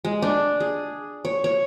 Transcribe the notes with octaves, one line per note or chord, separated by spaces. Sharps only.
G#3
D4
G#4
C#5
C#5